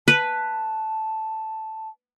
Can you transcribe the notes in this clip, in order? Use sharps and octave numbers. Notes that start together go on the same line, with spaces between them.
B4 A5